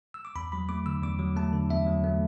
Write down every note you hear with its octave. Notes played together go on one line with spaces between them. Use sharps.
E6
D6
E2 B5
F#3 B5
A3 D6
D3 E6
E2 D6
F#3
A3 A5
D3
E2 E5
F#3
A3